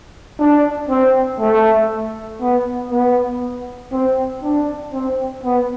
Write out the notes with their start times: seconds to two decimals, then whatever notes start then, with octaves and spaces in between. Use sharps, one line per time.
0.39 D4
0.89 C4
1.40 A3
2.41 B3
2.91 B3
3.92 C4
4.43 D4
4.93 C4
5.43 B3